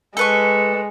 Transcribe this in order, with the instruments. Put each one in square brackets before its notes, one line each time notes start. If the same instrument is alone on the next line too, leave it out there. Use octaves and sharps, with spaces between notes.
[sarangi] G#3 [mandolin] A4 B4 C#6